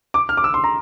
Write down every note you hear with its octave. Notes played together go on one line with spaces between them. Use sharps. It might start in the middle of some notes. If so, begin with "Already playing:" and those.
D6
F6
D6
E6
C6
A#5